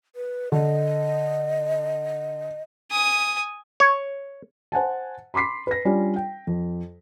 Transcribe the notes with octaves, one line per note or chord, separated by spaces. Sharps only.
B4
D3 D#5
G#5 D#6
C#5
C5 F#5 G#5 A5
B5 C6 D6 B6 C7
B4 A#6
G3 C#4 D4 F4
G5
F2